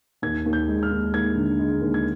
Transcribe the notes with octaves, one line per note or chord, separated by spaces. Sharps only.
D#2 G#6
D#2
G6
G#3
F6
D#2
D#2 G#6
D3
G#3
D#2
G#6